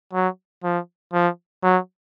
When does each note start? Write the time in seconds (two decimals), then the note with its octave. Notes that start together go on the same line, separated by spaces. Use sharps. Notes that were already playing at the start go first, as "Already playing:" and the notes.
0.13 F#3
0.64 F3
1.13 F3
1.63 F#3